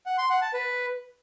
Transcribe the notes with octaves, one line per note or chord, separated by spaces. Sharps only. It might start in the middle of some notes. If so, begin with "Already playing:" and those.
F#5
C6
F#5
A5
B4